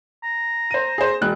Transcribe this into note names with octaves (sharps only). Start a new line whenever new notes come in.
A#5
C5 D#7
G#4 C5
E1 F#6